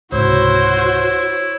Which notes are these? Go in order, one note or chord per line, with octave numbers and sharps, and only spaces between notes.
C#2 G#2 C3 E4 F#4 C5 C#5